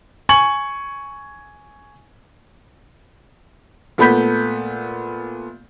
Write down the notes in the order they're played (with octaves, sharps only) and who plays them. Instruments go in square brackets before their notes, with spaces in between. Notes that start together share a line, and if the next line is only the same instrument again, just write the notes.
[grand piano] G#5 C#6 G#6 F#7
[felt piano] A#2 A3 B3 B5 G6 B6